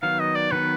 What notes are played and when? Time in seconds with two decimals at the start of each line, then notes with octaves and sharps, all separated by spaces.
0.02 D#3 F#3 B3 F5
0.20 D#5
0.35 D5
0.51 D#3 F#3 B3 B4